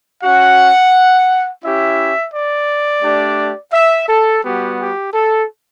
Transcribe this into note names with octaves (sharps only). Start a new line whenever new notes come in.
C#4 F#4 F#5
C#4 E4 G4 E5
D5
A3 D4 G4
E5
A4
G3 B3 F#4 G4
G4
A4